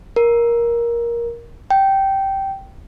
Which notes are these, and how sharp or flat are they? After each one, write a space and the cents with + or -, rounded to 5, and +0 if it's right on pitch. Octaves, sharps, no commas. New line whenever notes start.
A#4 +15
G5 -10